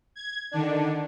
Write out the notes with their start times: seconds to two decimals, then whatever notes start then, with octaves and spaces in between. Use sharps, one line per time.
0.16 G#6
0.51 D3 D#3 D4